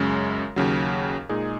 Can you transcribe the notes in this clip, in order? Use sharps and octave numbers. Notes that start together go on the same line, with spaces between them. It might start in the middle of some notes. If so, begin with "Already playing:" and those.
Already playing: F#2 C#3 G#3
D#2 C#3 F#3
A#2 G#3 D#4 G#4